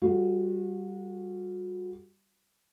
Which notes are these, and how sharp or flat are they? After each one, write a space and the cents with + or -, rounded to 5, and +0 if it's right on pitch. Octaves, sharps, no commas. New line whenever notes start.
G3 -5 F#4 -35 A4 -20